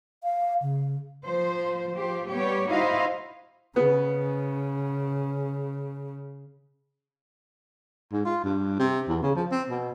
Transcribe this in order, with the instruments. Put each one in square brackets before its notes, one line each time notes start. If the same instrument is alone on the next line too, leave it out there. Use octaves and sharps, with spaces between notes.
[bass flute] F5
C#3
[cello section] F3 C5
F3 G4 C5
G3 B3 G4 C#5
D#4 E4 F#4 C5 D#5 F5
[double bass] C#3 [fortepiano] B3
[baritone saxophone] G#2
F4
G2
C3
E2
C#3
F3
C4
B2